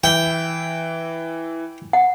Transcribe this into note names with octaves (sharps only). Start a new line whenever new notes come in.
E3 E4 E5 G5
F#5